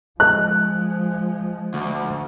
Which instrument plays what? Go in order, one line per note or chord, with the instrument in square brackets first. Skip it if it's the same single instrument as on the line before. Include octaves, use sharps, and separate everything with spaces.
[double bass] F3 G#3 [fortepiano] F#6
[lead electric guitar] D2